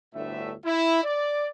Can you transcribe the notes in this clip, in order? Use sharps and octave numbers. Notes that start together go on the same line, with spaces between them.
G1 D2 A2 A3 E5
E4
D5